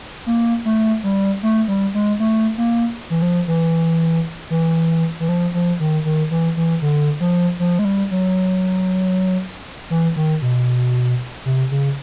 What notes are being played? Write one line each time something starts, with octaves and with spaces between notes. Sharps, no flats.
A#3
A3
G3
A3
G3
G#3
A3
A#3
E3
F3
E3
E3
E3
F3
F3
D#3
D#3
E3
E3
D3
F3
F3
G#3
G3
F#3
E3
D#3
B2
C3
C#3